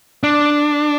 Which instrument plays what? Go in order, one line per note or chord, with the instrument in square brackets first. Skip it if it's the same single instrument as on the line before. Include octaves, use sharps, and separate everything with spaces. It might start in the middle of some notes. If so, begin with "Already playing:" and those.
[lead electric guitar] D4